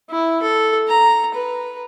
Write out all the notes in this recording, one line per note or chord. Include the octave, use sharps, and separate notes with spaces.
E4
A4
A#5
B4